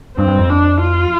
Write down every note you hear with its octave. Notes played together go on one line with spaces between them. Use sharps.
G2 C4
G2
F2
D4
F4